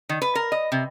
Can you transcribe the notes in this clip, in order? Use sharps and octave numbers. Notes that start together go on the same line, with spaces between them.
D#3
B4
A#4
D#5
C3